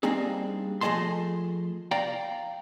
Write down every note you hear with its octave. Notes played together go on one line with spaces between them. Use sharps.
G3 A#3 C4 D4 D#4 G#4
F3 A3 G#4 D#5 A5 C6
D5 F5 G5 A#5